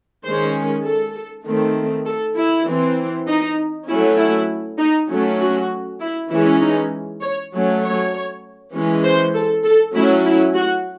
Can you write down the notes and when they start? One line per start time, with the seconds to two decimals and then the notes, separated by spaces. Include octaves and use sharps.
0.24 D#3 G#3 C#4 C5
0.84 A4
1.46 D#3 A3 C4
2.06 A4
2.36 E4
2.66 E3 C4
3.27 D#4
3.88 F#3 A3 C#4 E4
4.18 E4
4.78 D#4
5.10 F#3 A3 C#4
5.40 F#4
6.00 E4
6.31 E3 G#3 C#4 E4
6.61 D#4
7.21 C#5
7.52 F#3 A3 C#4
7.83 C#5
8.73 E3 G#3 C#4
9.04 C5
9.34 A4
9.65 A4
9.94 F#3 A3 C#4 E4
10.25 E4
10.55 F#4